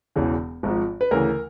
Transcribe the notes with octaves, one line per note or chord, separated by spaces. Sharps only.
E1 E2 C#3 E3
G#1 G#2 F3
B4
D2 C#3 E3 A#4